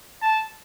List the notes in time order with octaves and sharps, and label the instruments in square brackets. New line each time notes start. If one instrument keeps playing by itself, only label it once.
[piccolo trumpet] A5